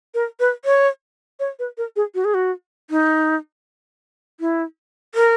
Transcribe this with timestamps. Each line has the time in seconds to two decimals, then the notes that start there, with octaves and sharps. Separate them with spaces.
0.14 A#4
0.40 B4
0.65 C#5
1.40 C#5
1.59 B4
1.78 A#4
1.96 G#4
2.15 F#4
2.25 G#4
2.34 F#4
2.90 D#4
4.40 E4
5.15 A#4